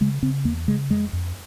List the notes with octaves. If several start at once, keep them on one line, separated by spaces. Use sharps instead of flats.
C#3 G#3
C#3 C4
E2 A#3
C#3 G#3
F2 G#3
F2